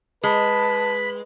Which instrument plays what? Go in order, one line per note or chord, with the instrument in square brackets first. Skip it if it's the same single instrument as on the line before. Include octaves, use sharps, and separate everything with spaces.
[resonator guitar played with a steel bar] G#3 [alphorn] B4 [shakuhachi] A5 [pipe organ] B5